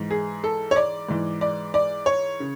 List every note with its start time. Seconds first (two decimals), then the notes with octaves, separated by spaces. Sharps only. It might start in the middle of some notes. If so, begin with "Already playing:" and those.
Already playing: G#2 E3
0.11 G#4
0.44 A4
0.71 C#5
0.76 D5
1.08 G#2 E3
1.41 D5
1.74 D5
2.06 C#5
2.40 C#3